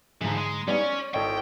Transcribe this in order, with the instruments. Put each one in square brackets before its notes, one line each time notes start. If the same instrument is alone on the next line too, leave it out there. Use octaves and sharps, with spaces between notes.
[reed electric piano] G#2 D3 [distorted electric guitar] E3 F3 [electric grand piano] G#4 A#5
[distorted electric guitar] G#3
[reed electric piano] G3 B3 D#4 [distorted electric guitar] C#4 [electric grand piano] D5
[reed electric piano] C#5
[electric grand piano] G#1 D#5 [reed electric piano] E4 A4 C#5 [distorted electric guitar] G5